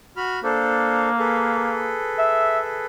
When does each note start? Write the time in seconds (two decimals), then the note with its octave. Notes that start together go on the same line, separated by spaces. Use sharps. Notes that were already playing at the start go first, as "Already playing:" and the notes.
0.17 F#4 B5 F6
0.44 A#3 D4 A4 C5
1.19 G#4 A4 B4
2.19 E5